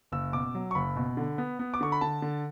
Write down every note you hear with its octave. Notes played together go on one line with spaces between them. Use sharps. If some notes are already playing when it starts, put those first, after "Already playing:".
F#1 E6
B2 D6
F#3
C#6
F#1 B5
B2
D3
B3
B3
D6
D3 C#6
B5
D3 A5
D3